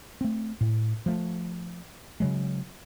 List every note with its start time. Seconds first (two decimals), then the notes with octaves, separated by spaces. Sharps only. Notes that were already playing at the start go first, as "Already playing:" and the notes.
0.21 A3 C4
0.61 A2
1.06 F3 A3
2.20 C#3 F#3 G#3